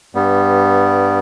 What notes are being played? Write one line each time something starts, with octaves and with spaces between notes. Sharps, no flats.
G2 G3 B3